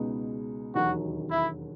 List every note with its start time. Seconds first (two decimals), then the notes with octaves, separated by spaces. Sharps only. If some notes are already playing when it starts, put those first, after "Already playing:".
Already playing: C#2 B2 G#3 B3 D#4
0.74 E1 D#2 D#3 F#3 F#4
1.31 E4